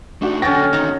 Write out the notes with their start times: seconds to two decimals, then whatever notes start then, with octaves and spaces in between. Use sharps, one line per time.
0.22 A3 D4 D#4 F#4
0.42 D3 F#3 C#4 F#4 G4 G5 A6 A#6
0.73 E2 D#3 D#4 A#5